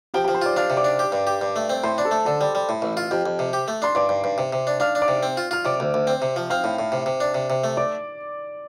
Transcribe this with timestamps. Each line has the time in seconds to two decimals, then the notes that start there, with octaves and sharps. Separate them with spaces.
0.14 F3 G4 G5
0.24 G4 G5
0.28 F3
0.35 C5 C6
0.42 F4 D5 D6
0.56 D4 F5 F6
0.70 C3
0.77 D5 D6
0.84 D4
0.99 G4
1.12 G2
1.27 G4
1.41 G2
1.56 A3
1.70 C4
1.83 A2 C5 C6
1.98 D4
2.05 A4 A5
2.11 A3
2.25 D3 A4 A5
2.41 G3
2.55 G3
2.69 A2
2.82 A1
2.97 F4
3.11 F2 G4 G5
3.26 F2
3.39 C3
3.53 G4
3.68 A3
3.82 D4 C6
3.95 G2 D5 D6
4.09 G2
4.24 G2
4.38 C3
4.53 C3
4.67 D4
4.80 D4 F5 F6
4.95 D4
5.02 D5 D6
5.08 C3
5.23 C4
5.37 F4
5.51 F4 F6
5.65 C3 D5 D6
5.80 D2
5.94 D2
6.07 C4
6.22 C3
6.36 F3
6.50 C4 F5 F6
6.64 A2
6.79 A2
6.92 C3
7.06 C3
7.20 D4
7.35 C3
7.50 C3
7.64 A3
7.77 D5 D6